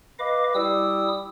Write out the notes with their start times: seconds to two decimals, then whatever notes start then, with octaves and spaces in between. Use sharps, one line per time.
0.19 B4 D#5 F5 D6
0.55 G3 E4 D#6 E6